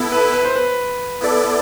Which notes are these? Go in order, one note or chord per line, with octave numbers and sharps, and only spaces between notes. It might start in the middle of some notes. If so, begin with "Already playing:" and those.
Already playing: B3 E4 A4
B4
B4
C5
B4
B3 E4 A4 D5